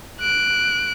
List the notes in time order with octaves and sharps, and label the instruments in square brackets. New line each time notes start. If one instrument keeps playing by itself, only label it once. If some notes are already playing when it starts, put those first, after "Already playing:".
[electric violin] F#6 D7